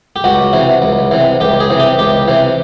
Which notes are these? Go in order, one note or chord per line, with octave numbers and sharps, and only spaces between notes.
G4
C#2 F#4
C3 E3
C#2
C3 E3
C#2 G4
G#4
C3 E3
G4
C#2 G4
C3 E3